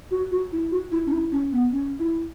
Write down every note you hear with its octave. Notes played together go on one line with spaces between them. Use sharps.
F#4
F#4
E4
F#4
E4
C#4
E4
C#4
B3
C#4
E4